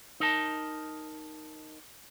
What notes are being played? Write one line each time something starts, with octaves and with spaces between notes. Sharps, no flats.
D#4 A#4 A5